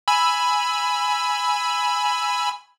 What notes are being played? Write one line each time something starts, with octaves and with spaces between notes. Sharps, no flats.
G#5 B5 E6